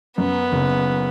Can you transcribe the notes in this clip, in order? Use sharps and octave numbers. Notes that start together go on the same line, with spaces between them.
F#2 B3
F#1